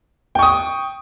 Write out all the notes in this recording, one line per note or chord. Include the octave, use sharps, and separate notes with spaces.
G5 C#6 D#6